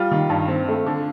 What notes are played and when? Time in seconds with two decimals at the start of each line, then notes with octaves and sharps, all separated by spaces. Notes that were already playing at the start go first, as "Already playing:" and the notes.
Already playing: G3 F4
0.11 D#3
0.29 G2
0.48 C4
0.68 A3
0.86 D3